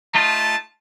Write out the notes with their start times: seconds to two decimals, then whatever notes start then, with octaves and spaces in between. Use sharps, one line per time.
0.15 A3 D#4 F4 A5